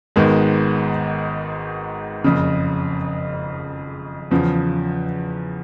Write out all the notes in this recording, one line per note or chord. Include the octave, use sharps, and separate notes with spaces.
G#1 G#2 D#3 G#3 B3
F#1 F2 C#3
E2 C#3 F3